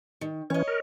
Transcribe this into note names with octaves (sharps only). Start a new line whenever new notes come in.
D#3
E3 C#4 C#5 D#5
A#4